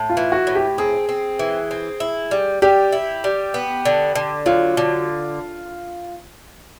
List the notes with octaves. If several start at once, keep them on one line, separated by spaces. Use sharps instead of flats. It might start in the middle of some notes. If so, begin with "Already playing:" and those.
Already playing: A2
F4
E3
F#4
A2
G4
C4 G#4
C4
E3
C4
E4
G3
G3 G4
E4
G3
B3
D3
D3
F#3 F4
D3